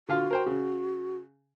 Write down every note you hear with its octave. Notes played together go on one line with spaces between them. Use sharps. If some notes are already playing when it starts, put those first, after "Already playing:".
D3 F4 F#4 F5
A#4 C5 G5
C#3